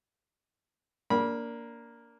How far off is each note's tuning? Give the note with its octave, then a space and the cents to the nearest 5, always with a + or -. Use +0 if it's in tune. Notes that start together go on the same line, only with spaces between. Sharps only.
A#3 +0 D4 -20 B5 -25